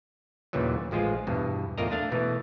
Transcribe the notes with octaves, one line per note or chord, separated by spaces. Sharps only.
D#2 A#2 C#3 E3 F#3
A1 F3 G#3 F4 G#4
E2 G2 B2
E2 A2 F4 A#4 D#5 A#5
A3 D4 F5
B2 E3 A3